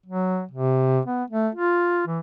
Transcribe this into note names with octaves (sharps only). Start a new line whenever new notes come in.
F#3
C3
B3
A3
F4
E3